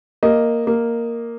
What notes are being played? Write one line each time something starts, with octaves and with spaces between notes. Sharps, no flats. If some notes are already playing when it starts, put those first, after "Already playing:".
A#3 D#5
A#3